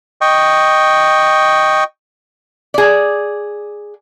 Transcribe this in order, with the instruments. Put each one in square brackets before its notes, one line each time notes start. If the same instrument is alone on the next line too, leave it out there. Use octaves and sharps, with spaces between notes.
[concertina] D#5 G5 C#6
[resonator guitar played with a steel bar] G#4 D5